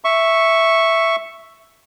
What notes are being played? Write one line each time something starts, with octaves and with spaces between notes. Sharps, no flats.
E5 C#6